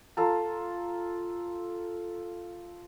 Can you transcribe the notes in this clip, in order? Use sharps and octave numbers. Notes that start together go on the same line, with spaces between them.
F4 A4 A#5